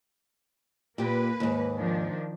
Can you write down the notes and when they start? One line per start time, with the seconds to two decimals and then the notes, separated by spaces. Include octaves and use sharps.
0.98 A#2 A#3 G4 B4
1.40 D#2 G#2
1.78 D#3 F3 D4